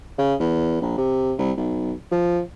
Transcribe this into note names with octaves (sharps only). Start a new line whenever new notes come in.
C#3
E2
A#1
C3
C2
B1
F3